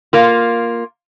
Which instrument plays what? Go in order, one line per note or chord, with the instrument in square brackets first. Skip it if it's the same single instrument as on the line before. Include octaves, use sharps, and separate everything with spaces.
[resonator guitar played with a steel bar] A#3 F4